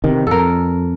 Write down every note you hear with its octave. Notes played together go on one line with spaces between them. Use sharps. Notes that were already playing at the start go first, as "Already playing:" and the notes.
C3 D#3
F2 A4 A#4